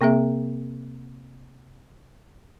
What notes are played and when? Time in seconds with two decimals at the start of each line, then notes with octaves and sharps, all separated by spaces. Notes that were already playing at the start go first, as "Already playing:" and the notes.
0.01 C3 A#3 C4 G#4 E5